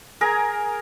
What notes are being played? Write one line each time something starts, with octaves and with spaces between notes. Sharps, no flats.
G#4 A#4 G#5 A#5